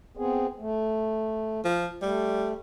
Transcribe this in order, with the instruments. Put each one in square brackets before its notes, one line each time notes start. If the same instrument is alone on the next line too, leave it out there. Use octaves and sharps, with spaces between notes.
[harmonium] B3 C4 G#4
A3
[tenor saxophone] F3
[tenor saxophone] G3 [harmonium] A3